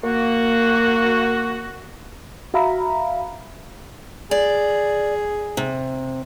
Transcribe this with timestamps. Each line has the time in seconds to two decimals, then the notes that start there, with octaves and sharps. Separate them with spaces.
0.04 A#3 F#4
2.54 F#4 E5 F5 A#5 B5
4.31 G#4 D5
5.57 C3